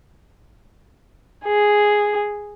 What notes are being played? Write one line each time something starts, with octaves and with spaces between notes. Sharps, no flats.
G#4